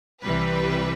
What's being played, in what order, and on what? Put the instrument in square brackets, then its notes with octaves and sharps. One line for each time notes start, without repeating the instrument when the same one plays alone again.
[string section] C2 C3 E3 G3 B4